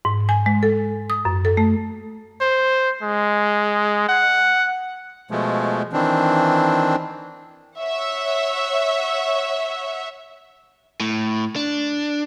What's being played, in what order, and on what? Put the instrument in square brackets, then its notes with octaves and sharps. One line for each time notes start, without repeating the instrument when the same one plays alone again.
[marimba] G#2
G#5
G#3
A4
D#6
F#2
A4
A3
[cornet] C5
G#3
F#5
[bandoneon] B2 F3 G#3 A3
D#3 E3 C4 D4
[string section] C#5 E5 F#5
[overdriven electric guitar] A2
D4